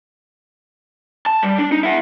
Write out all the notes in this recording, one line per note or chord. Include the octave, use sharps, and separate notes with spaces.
A5
G3
D4
D#4
E4 F#5